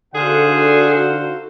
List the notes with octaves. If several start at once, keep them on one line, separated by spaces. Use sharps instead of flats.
D3 D#4 F#4 G#4 A4 C5 F5 F#5